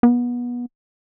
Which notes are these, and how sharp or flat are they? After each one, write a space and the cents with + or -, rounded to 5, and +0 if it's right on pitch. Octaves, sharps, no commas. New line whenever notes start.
B3 -25